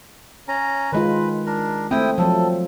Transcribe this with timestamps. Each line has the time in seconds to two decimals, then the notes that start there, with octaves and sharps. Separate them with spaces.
0.48 C#4 A#5
0.92 D#3 G#3 F4 B4
1.46 D4 A#4
1.91 A3 C4 E4 G5 D#6
2.18 F3 F#3 A4